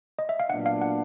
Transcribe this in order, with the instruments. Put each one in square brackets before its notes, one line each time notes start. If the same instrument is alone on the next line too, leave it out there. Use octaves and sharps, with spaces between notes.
[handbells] D#5
E5
F5
[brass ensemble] A#2 F#3 B3 D4 [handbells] F#5
[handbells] F5
F#5